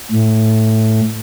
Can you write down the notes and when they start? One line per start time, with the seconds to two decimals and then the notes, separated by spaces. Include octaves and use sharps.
0.12 A2